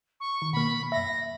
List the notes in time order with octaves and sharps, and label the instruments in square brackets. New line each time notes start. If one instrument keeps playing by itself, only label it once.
[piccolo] C#6
[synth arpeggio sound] D#3
[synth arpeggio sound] B2 A#3 [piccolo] B5
[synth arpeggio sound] F#2 E5 [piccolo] A#6